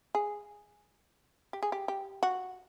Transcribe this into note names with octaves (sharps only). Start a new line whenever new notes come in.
G#4
G4
G#4
G4
G4
F#4